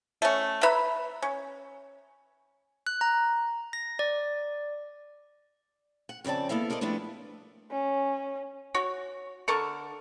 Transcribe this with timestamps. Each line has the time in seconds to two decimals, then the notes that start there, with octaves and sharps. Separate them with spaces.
0.22 A3 C#4
0.63 B4 E5 A#5 B5
1.22 C#4
2.87 F#6
3.01 A#5
3.73 A#6
3.99 D5
6.09 F#5
6.24 F2 C#3 C4 D5 A5
6.49 A#3 B3 E4 A4 E5 F5
6.70 A4 A#4 C5 D5 D#5
6.81 F3 G3 A3 B3 D4 E4
7.71 C#4
8.74 F#4 C#5
9.48 D3 A4 A#4 C#6